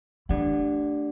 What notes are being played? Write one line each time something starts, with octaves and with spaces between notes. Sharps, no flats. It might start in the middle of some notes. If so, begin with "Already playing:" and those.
E3 A3 D4 G4 D5 F#5